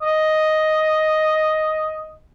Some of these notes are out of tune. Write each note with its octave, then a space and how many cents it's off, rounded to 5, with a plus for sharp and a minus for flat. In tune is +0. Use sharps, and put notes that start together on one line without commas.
D#5 +5